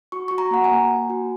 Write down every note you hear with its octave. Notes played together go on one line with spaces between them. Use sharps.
F#4 C#6
F#4 C#6
A#5
A#3 F#5
G#5
A#3
A#3
F#4